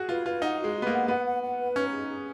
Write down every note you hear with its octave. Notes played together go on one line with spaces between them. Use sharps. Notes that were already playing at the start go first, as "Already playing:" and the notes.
Already playing: F#4 G#4
F4 B4
F4 B4
D#4 F#5
G#3 F#4
F#4
B3
A#3
F#5
B3 F#5
F#5
F#5
B4
C#4 D#4
G#4
G#4